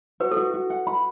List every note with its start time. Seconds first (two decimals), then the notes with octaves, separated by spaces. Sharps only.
0.20 F#4 B4
0.31 A4
0.37 F#4
0.54 F#4
0.70 F#5
0.87 B5